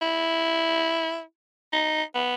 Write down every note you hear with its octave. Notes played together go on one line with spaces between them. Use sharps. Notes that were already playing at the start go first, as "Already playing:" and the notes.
E4
D#4
B3